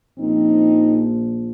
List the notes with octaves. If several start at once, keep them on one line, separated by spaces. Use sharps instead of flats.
A#1 A#2 F3 C4 D#4